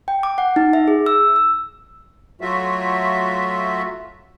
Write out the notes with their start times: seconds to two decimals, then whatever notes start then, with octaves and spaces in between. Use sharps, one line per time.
0.08 G5
0.23 D6
0.38 F#5
0.56 D#4
0.73 E5
0.88 G#4
1.06 E6
1.36 E6
2.41 F#3 A3 F4 F#4 E5